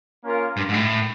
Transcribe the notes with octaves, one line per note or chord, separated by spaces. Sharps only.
A#3 C#4 F4 A#4
G2
G#2
A2